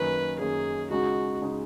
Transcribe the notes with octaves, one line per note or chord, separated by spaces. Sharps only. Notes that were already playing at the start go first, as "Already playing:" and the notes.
Already playing: F#2 D#3 A#3 C#4 B4
F#2 D#3 A#3 C#4 G#4
C#2 C#3 G#3 D#4 F#4
C#3 G#3 D#4